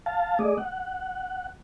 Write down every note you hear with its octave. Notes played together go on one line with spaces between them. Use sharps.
F5 A5
A3 G#4 D5 D#5
F#5